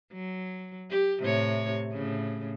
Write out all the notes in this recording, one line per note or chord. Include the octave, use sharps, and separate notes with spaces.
F#3
G4
A2 C3 C#5
A2 C#3